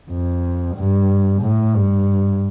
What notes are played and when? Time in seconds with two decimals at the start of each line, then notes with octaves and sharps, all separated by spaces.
0.10 F2
0.76 G2
1.42 A2
1.75 G2